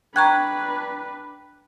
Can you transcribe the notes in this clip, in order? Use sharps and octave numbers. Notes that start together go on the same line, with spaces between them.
D4 B4 G5 A#5 C#6 F#6 G#6